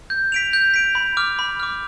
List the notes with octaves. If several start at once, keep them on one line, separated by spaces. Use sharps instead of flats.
G6
B6 D7 F7
G6
B6 D7 F7
B5
D6 F6
B5
D6 F6